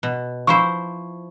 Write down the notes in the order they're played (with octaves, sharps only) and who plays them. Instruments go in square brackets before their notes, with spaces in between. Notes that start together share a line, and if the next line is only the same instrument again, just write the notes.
[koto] B2
[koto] F3 E4 C5 [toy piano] C#6